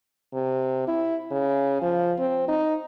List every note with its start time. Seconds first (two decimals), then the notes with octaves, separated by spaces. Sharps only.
0.34 C3
0.88 E4
1.31 C#3
1.82 F3
2.19 C4
2.48 D#4